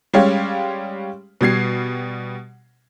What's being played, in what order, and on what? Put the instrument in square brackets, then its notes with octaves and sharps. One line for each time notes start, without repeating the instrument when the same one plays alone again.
[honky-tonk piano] G3 G#3 C#4 G4 C#5 F5
B2 G3 G#6 C7